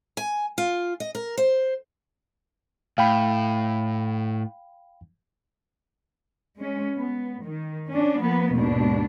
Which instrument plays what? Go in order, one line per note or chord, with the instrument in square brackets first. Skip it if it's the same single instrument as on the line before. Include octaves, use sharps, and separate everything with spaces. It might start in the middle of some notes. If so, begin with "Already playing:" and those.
[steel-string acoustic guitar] G#5
F4
D#5
A#4
C5
[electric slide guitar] A2 [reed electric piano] F5 G5 B5
[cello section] G#3 C#4
B3
D#3
C#4 D4
F3 A#3 B3
D#2 G#2 B2 D4